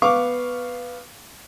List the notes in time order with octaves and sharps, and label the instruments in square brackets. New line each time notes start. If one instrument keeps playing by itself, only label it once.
[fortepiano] B3 F5 C#6 D6